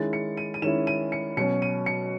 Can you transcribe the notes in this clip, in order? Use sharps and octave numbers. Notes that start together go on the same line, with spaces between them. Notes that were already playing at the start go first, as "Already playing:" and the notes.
Already playing: D#3 G#3 C#4 E4 A6
C#7
D#7
D#7
D#3 G#3 C#4 E4 E7
D#7
C#7
B2 F#3 C#4 C#7
D#7
C#7